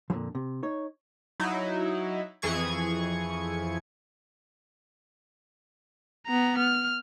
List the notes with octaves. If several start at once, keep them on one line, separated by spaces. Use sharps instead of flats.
F2 A#2 D3 E3 F3
C3
D#4 C#5
F#3 D#4 E4
F2 E3 G#4 C#6 G#6
B3 A#5
F6